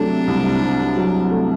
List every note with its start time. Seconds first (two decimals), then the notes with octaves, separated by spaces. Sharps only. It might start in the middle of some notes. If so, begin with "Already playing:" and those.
Already playing: C3 F#3 A3 D4
0.28 C2
0.62 C3
0.96 F#3
1.31 A3